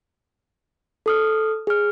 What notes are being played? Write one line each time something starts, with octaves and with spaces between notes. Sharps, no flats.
A4 D#6 F6
G#4 F6